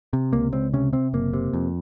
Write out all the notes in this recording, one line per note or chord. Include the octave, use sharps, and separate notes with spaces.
C3
C#2 A#3
C#2 C4
C3 C#4
C3 C4
F#1 A#3
C3
F2